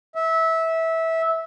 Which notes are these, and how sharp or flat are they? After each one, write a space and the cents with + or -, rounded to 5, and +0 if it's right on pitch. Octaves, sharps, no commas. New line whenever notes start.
E5 -20